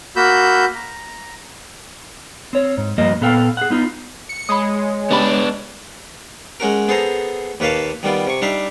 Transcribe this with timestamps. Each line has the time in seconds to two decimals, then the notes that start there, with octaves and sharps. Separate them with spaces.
0.16 A#3 F#4 B5 E6 G6
0.76 A#5
2.53 C4 C#5
2.77 G#2
2.98 G2 F3 A#3 F#4 D#5
3.21 A#2 B3 A4 F5 G5
3.57 G#4 F#5
3.70 B3 D#4 F4
4.29 C#7
4.49 G#3 C#5 B5 D#6
5.11 C#3 B3 D4 G4 B5
6.60 G#3 C#4 F#4 A#4
6.88 B3 G#4 A4 C5 A#5
7.60 D#2 A#3 B4 C#5 F5 A5
8.03 D#3 G3 B3 F4
8.27 C3 C#6
8.42 G3 D4 D#4 E5 F5